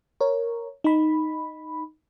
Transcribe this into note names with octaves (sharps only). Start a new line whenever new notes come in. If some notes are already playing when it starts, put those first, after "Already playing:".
A#4 C#5
D#4 B5